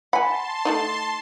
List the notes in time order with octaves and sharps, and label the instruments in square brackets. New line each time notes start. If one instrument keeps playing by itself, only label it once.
[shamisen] F#5 G#5 [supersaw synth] A5 C6 [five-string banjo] B5
[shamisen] A3 D4 D#4